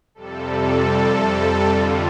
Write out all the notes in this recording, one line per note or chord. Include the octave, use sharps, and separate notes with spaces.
F2 C3 G3 A4
A4
F2 D3 G3 F4